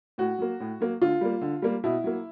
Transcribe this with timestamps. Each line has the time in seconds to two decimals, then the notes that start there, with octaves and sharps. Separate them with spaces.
0.18 A2 F#4
0.39 F#3 A#3
0.60 A2
0.81 F#3 A#3
1.01 D3 F4
1.21 G3 A#3
1.41 D3
1.62 G3 A#3
1.84 B2 E4
2.04 F#3 A#3